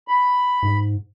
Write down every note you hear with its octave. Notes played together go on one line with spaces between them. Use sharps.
B5
G#2